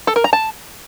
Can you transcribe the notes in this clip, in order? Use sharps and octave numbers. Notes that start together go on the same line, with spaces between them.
A4
A#4
A#5
A5